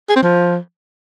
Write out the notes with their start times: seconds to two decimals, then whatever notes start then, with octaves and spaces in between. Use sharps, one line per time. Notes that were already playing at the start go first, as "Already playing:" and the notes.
0.09 G#4
0.16 C4
0.23 F3